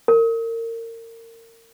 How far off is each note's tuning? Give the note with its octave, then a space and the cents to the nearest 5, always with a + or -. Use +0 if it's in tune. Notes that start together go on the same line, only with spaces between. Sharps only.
A#4 -30